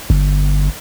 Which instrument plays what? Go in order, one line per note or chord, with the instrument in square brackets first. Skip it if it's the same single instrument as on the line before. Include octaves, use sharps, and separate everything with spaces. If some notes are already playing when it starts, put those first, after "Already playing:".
[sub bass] G1